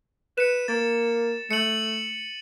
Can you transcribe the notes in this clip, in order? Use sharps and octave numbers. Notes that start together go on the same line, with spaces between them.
B4 C#7 E7
A#3 A6
A3 C#7 D#7 F#7